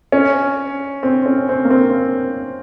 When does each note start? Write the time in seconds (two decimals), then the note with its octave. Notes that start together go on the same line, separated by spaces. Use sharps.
0.12 C#4
1.03 C4
1.26 C#4
1.49 C4
1.65 A#3
1.71 C4